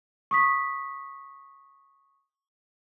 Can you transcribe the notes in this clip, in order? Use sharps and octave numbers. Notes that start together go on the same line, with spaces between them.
C#6 D#6 B6